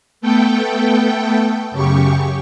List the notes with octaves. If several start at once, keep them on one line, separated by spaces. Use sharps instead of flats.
A3 B3 A4 G5
F#2 C#3 G4 C#6